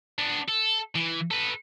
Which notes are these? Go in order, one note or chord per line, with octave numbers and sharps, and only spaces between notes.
B3 D4
A4
E3
A4 B4